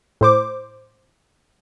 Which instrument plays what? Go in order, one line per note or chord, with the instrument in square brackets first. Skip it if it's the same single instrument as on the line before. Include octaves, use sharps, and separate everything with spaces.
[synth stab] A2 C5 D6